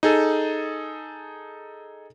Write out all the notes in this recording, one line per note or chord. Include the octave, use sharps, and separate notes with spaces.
D#4 G#4 A4